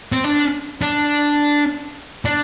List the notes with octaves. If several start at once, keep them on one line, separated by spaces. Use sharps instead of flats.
C4
D4
D4
D4